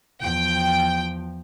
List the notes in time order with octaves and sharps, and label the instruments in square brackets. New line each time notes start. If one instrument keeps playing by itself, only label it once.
[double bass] E2 F3 [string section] G5